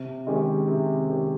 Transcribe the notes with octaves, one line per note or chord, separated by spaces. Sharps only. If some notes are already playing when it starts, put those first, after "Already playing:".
Already playing: C3
D#3 G#3 C#4 G4
C3
D#3 G#3 C#4 G4